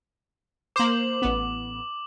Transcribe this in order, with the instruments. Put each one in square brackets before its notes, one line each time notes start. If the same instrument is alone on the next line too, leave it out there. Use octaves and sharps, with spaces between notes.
[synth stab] A#3 C5 [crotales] D6 F#7
[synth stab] A1 B3